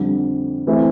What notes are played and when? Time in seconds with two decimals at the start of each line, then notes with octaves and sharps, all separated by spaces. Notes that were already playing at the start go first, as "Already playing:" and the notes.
Already playing: F2 D3 G3
0.67 E3 A3 C4 E4